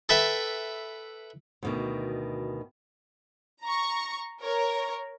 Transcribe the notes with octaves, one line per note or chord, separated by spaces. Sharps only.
A4 B4 E5 G5
D2 B2 D#3
A#5 C#6
A#4 C#5